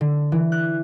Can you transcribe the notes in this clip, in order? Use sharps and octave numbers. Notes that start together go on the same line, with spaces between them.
D3
E3
F#6